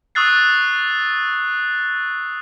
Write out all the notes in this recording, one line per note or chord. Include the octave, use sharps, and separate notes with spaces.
C#6 D#6 E6 F#6 A6 C7